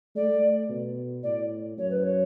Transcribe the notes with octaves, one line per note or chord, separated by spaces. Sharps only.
A3 D5
B2
A2 D5
F#2 C#5
B4
C#5